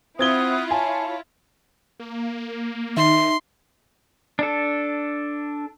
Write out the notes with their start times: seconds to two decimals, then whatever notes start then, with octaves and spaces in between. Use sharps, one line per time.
0.19 C4 E4 F4 F#5 D#6 F#6 G#6 G7
0.71 C#5 G#5 A5
2.00 A#3
2.97 D#3 D#4 E5 C6
4.39 D4 A4